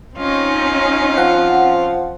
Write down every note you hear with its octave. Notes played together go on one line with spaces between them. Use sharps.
C4 C#4 D#4 F4
F3 F#5